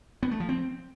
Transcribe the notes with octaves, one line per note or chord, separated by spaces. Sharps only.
B3
A3
F3
C4